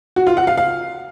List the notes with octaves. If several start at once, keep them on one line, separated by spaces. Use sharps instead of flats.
F#4
F4
F#5
F5
F5